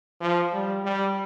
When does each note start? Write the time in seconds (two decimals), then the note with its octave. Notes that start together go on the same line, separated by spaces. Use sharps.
0.21 F3
0.53 G3
0.85 G3